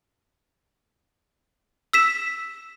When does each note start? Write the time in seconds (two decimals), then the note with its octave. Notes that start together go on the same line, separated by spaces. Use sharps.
1.93 E6 B6 E7